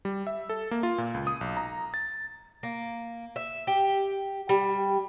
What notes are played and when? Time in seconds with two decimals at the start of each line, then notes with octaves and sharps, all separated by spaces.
0.05 G3
0.27 E5
0.49 A4
0.71 A#3
0.83 F4
0.98 A#2
1.14 C#2
1.27 D#6
1.41 B1
1.57 A#5
1.94 A6
2.63 A#3
3.36 E5
3.67 G4
4.49 G3